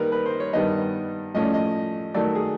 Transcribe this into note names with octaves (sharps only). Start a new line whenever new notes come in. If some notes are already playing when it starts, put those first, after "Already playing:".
Already playing: D#3 G3 A#3 D#4 A#4 B4
B4
C5
C#5
G2 D#3 G3 B3 D#4 D#5
A2 F3 A3 C#4 D#5
D5
D#5
D#3 F#3 A3 D5
G#4